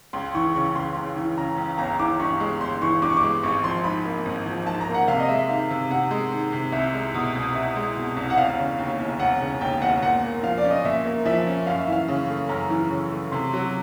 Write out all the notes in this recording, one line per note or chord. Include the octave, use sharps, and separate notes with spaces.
C#2 C6
E3 C#6
C#3 C#6
C#2 C6
C#2
E3
C#3 A#5
C#2
G1 A#5
E3 D6
G2 C#6
G#3
G1 C6
E3 C#6
G2 D6
C#6
D6
G#3
G#1 C#6
F3 C6
G#2 B5
A#3
G#1
F3
G#2 A5
A#5
A#3
F#5
C3 F5
D#5
G#3 E5
D#3 F5
C3
C3 F#5
G#3
D#3
C3
C2 E5
G#3
B2
C2
C2 E5
G#3
B2
C2
F#5
E1 F5
C#3
D#2
E1
E1 F#5
C#3
D#2 G5
E1 F#5
A#2 F#5
A#3
F3 F5
D5
C#4
D#5
A#2 E5
A#3
F3 E5
C#4
F#2 F5
E5
E3 F5
C#3
A3
F#2 A#5
E3
C#3
A3
C3 C6
F#3